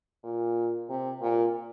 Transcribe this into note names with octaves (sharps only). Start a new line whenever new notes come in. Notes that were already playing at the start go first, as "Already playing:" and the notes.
A#2
C3
A#2